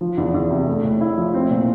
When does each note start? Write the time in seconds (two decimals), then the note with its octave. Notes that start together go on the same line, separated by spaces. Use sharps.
0.01 F3
0.18 E2
0.34 E2
0.50 C3
0.67 A3
0.84 A2
1.01 E4
1.18 F3
1.34 C4
1.51 A#2